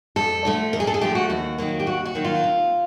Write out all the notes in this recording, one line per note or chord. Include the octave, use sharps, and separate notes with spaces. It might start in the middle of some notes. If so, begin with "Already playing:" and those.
F2 A4
D3 F3 A3
F2 A#4
G#4
A4
G#4
D3 F3 A3 G4
F#4
D#2 F#4
D#3 F#3 A#3
G4
D#2 F#4
F#4
D#3 F#3 A#3
F4
C3